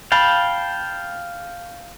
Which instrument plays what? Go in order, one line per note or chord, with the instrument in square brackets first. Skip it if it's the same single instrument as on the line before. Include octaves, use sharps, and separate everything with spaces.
[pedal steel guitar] F5 G5 A5 [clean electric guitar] B5